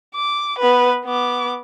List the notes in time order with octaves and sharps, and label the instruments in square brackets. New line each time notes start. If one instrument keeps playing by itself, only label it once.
[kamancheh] D6
B3 B4
B3 D6